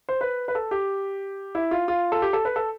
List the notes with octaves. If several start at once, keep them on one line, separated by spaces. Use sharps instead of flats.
C5
B4
B4
A4
G4
E4
F4
F4
A4
G4
A4
B4
A4